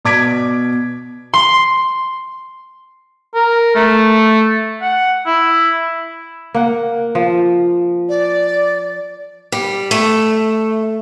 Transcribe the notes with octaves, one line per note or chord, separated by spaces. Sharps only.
B2 D5 D6 G#6 B6 D7
C6
A#4
A3
F#5
E4
A#3 F#5
F3
D5
G3
A3